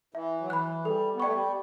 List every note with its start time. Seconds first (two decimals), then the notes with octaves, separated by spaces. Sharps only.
0.14 E3 E5
0.41 F#3
0.50 E3 B5 F#6
0.85 G3 A4
1.15 B3
1.20 A3 D5 G5 C#6
1.33 G3